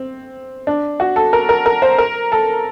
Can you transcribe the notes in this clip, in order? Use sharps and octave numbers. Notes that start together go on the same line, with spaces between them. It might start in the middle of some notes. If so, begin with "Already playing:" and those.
Already playing: C4
D4
F#4
A4
A#4
A#4
A#4
C5
A#4
A4